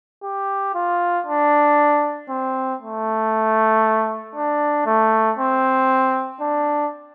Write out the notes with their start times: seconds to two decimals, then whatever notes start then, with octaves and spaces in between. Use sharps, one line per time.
0.23 G4
0.75 F4
1.27 D4
2.30 C4
2.81 A3
4.36 D4
4.86 A3
5.39 C4
6.41 D4